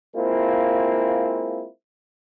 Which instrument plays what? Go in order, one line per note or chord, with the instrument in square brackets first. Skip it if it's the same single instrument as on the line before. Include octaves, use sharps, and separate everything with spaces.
[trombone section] G#3 A#3 C4 E4 F4